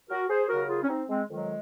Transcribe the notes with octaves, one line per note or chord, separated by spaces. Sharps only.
F#4 A#4
G#4 C5
D#2 C#3 F#3 F#4 A#4
F4 G#4
C#4
C4 D#4
G#3 C4
F2 D#3 F#3 G#3